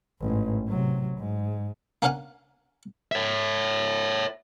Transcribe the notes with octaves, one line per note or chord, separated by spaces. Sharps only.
A1 G#2
C3 F#3
G#2
A#3 C#4 D4 F5 F#5 G#5
C#5 E5